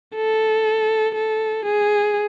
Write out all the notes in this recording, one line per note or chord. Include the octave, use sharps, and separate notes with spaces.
A4
A4
G#4